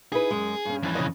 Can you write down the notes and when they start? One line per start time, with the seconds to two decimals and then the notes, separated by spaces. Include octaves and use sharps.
0.12 D#4 E4 G#4 B4
0.31 F#2 G#3
0.65 G2 C#4
0.83 F2 E3
0.95 C#3 C#5 D#5